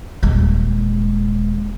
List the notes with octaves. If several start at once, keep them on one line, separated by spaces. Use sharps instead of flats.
D#1 G#3